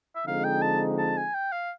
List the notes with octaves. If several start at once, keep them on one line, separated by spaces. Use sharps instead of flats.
E5
D3 F3 G#3 C4 D#4 F5
G5
A5
A5
G#5
G5
F5